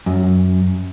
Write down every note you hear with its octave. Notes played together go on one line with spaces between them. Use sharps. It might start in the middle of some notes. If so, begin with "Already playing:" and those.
F#2